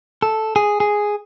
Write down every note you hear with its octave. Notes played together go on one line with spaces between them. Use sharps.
A4
G#4
G#4